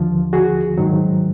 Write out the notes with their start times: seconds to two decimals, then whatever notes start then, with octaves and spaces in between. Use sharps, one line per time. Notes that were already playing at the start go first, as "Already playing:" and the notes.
Already playing: D#2 D3 F3
0.33 F#4 G#4
0.78 G#2 D#3 F#3